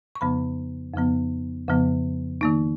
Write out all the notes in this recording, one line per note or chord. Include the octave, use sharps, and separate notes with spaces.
C#6
F2 C#3 F3 B3 B5
F2 C#3 F3 B3
F2 C#3 F3 B3
D#3 A#3 D#4